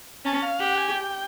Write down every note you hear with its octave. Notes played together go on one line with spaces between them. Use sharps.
C#4 A5
F5
G4 F#5
G5
G#5
G5